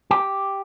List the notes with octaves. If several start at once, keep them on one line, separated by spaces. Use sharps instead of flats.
G4